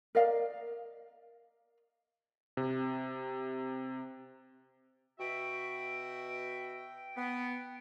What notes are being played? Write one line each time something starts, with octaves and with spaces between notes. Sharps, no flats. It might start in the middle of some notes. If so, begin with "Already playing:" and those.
A#4 D5 D#5 F5
C3
B2 F#4 E5 G5
B3